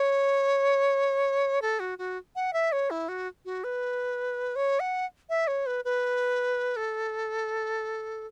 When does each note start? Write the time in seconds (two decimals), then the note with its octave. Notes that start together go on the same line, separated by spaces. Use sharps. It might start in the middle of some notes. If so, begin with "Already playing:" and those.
Already playing: C#5
1.62 A4
1.80 F#4
1.98 F#4
2.36 F#5
2.53 E5
2.72 C#5
2.90 E4
3.09 F#4
3.45 F#4
3.64 B4
4.56 C#5
4.80 F#5
5.30 E5
5.47 C#5
5.66 B4
5.85 B4
6.76 A4